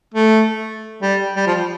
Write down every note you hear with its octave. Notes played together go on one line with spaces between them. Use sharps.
A3
G3
G3
F3